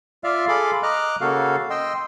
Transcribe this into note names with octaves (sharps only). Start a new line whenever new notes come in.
F4 D5 E5 F5 F6
G#4 A4 F5 B5 C6 D6
D#5 A#5 D6 F6 F#6
C#3 A#3 F#4 A4 F5
D#5 G5 C6 E6